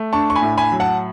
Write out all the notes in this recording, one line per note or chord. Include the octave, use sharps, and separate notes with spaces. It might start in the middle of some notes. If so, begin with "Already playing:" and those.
Already playing: A3
D4 A5 C#6
C#6
G#5 B5
A2
G#5 B5
F#3
F#5 A5